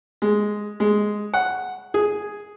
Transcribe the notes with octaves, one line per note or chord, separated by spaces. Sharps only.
G#3
G#3
F#5
G#4